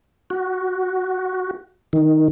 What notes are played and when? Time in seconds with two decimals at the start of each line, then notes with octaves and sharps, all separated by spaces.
0.30 F#4
1.93 D#3